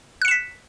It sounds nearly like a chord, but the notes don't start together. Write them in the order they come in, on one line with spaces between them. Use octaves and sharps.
F#6 C#7 E7 B6